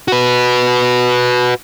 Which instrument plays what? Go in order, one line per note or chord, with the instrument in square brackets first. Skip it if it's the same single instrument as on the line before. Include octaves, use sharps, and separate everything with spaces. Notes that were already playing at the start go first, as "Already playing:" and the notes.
[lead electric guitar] F#4 B4